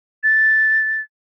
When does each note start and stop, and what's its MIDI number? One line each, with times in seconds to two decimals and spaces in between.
0.23 1.01 93